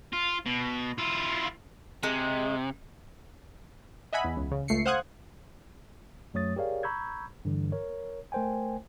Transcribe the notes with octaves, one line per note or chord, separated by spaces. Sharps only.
F4
B2
E4 F4
C3 G#3
D#5 E5 F#5 G#5 B5
E2
C#2
C#3
C#2 A3 C7 C#7
C5 F5 F#5 D#6 F#6 G#6
F#2 F#3 A3 C#5 D#6 A6
G4 G#4 A#4 C#5 D5 F5
A#5 B5 C#6 E6 G6 G#6
G2 D3 E3
A#4 C#5
A3 A#4 C5 G5 G#5